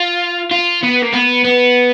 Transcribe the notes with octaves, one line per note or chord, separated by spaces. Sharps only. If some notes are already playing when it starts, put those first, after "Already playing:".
Already playing: F4
F4
B3
A#3
B3
B3